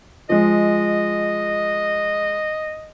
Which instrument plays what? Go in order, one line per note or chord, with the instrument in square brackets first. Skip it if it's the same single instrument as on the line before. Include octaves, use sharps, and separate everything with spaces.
[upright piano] F3 G#3 [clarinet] D#5